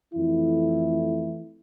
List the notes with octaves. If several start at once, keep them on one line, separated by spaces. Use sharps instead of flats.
F2 E3 A3 E4